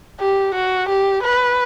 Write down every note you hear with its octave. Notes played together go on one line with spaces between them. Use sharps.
G4
F#4
G4
B4